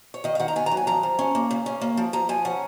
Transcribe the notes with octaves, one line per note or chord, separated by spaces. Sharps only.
C#5
D#3 D#5
F5
D#3 F#5
A#5
B3 G#5
A#5
F#3
G#5
F3 A#5
F3
C#4
A#3
C#3
C#4
A#3
F3
F3 A#5
F3 G#5
C#4 F#5